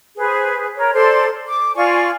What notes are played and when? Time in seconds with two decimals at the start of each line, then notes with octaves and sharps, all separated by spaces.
0.16 G#4 B4 C5
0.76 A#4 C#5
0.94 A4 C5 D5 C6
1.48 D6
1.75 F4 D5 G#5 C#6